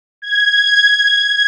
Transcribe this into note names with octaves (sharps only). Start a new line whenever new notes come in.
G#6